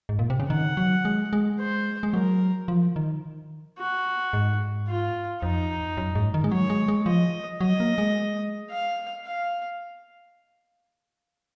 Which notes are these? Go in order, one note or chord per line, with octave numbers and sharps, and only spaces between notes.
G#2
A#2
C3
C#3
D#3 F#5
F#3
G#3
G#3
C5
G#3
F#3 A#4
F3
D#3
F#4
G#2
F4
F2 D#4
F#2
G#2
D#3
G#3
F#3 C#5
G#3
G#3
F3 D#5
F#3 D#5
A#3
G#3
F5
F5